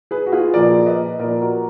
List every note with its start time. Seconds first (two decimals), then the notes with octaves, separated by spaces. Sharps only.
0.11 G#4 B4
0.26 F#4
0.32 F4 G#4
0.54 A#2 F3 A#4 D5
0.86 B4 D#5
1.19 A#2 F3 A#4 D5
1.41 F#4 A#4